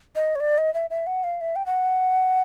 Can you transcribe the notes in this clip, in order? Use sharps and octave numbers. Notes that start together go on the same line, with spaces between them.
D#5
C#5
D5
D#5
E5
E5
F#5
F5
E5
G5
F#5